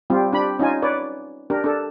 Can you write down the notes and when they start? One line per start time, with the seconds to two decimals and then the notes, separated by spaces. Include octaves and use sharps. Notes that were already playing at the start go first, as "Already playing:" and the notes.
0.10 G3 C4 F4 G4
0.33 D4 G4 B5
0.59 C#4 D#4 F4 G#5
0.82 B4 C#5 D5
1.50 D4 G4 A#4
1.64 D4 A4